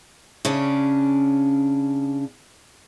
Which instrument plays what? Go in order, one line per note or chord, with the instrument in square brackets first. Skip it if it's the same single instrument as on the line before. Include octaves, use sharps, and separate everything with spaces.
[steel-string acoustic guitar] C#3 C#4 D4